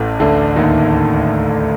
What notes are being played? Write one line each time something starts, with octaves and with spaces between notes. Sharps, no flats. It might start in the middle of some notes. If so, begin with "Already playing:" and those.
Already playing: A1 A2
D2 D3
D#2 D#3